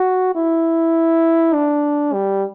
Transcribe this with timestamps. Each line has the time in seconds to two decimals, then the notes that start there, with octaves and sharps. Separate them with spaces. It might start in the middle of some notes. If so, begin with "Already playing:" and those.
Already playing: F#4
0.36 E4
1.54 D4
2.13 G3